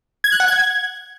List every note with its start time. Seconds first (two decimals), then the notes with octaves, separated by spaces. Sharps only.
0.24 G#6
0.32 F#6
0.40 F#5
0.48 G#6